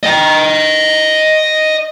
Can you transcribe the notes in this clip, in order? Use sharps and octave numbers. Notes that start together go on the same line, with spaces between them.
D#5 G5